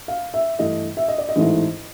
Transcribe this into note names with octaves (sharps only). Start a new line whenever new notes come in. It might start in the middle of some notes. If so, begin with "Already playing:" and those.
F5
E5
G2 E3 A3 D#5
E5
D#5
D5
D#5
A1 G#2 E3 A3